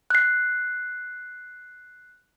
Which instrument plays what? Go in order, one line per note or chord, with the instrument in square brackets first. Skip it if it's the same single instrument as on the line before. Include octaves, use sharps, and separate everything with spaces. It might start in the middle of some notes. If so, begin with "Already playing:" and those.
[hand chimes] F#6 C7